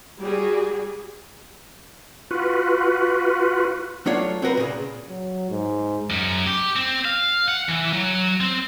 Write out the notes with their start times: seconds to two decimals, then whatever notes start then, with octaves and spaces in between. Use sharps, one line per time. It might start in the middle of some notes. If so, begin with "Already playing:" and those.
0.21 G3 F#4 G#4
2.31 F4 F#4 B4
4.06 F#3 A3 D4 F4 C#5 F5
4.42 C4 F#4 A#4 B4
4.57 A#2 C#3
5.08 F#3
5.50 G#2
6.10 F#2
6.46 G4
6.76 C4
7.05 F5
7.48 F#5
7.69 E3
7.93 F#3
8.41 C4